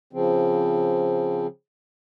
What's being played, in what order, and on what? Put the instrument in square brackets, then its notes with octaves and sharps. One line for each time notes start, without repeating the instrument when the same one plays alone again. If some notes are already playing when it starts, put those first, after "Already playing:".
[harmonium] C#3 F3 C4